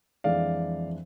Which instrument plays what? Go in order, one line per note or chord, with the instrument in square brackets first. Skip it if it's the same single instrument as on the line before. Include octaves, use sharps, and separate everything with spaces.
[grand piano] F2 E3 G#3 D4 D5 F5